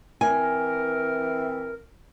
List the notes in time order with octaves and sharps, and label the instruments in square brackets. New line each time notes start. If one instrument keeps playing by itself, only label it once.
[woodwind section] E3 C4 [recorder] A#4 [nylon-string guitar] G#5